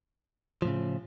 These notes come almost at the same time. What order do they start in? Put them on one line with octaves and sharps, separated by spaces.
F3 A2 C#3